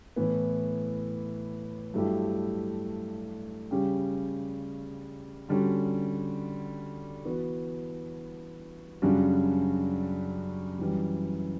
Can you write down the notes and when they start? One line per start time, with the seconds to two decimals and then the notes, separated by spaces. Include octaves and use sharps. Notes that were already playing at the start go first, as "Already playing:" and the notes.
0.16 A2 E3 B3
1.94 G2 F#3 A3 E4 G4
3.71 C#3 G3 C#4 G4
5.48 D3 G3 C#4 F#4
7.25 E3 B3 F#4
9.02 F#2 C#3 G3 D4 F#4
10.79 F#2 E3 G3